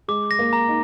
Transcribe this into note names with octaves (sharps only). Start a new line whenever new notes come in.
G#3 D6
A#6
A#3
A#5
D#4